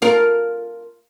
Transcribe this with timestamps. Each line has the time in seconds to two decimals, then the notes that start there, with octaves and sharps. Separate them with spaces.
0.02 F4 A#4